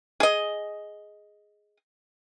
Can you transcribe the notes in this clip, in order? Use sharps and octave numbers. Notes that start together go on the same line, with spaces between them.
G#4 D#5